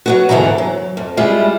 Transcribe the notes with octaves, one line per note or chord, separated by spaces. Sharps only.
F#3 B3 F#4
D#2 G#2 D3 E3 B3 A#5
F#3
F2
G3 G#3 E4 F4